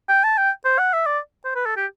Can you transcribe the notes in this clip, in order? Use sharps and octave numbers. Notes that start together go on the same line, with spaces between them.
G5
A5
G5
C5
F#5
E5
D5
C5
B4
A4
G4